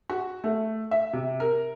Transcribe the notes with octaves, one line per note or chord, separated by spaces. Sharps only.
F#4
A3
E5
C3
A#4